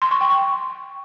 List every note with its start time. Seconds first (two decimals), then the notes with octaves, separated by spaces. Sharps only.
0.02 C6
0.11 C#6
0.21 G5
0.30 C#6